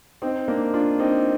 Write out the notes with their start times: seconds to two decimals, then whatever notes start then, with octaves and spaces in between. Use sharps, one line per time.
0.22 C4 D#4
0.48 A#3 D4
0.74 D4 F4
0.99 C4 D#4